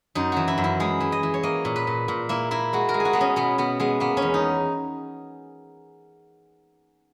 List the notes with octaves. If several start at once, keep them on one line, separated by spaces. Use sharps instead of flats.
F#2 D#4
E3 F#4
E4
F#2
E4
G#3 G#4
E3
D#5
E3
C#5
A#3 D#5
A#2
B4
A#2
A#2
A#3 E4
A#3 E4
G#3 F#4
A#4
G#3
G#4
F#4
G#3 B3
C#4
B2 B3
B2 B3
G#3 B3
A#3 B3
C#4
E2
D#4